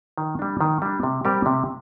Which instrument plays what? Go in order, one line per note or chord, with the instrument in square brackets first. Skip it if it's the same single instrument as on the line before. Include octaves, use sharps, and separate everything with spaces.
[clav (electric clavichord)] D#3
G3 D4
D#3
G3 D4
C3
G3 C4 G4 A#4
C3